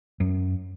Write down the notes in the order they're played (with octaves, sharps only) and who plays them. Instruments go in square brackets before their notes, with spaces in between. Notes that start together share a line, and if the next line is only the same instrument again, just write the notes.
[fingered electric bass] F#2